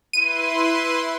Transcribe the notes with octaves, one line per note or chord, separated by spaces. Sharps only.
E4 B4 C6 D#7